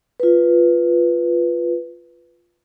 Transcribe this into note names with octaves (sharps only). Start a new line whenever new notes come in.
F4 B4